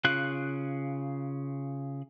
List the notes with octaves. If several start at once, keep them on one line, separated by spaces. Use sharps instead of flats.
C#3 F4 F#6